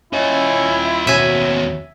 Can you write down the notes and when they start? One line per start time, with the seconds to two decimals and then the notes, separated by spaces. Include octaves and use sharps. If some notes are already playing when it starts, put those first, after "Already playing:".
0.13 C#4 E4 F4 D#5
1.07 D#2 B2 F#3 E5 G#5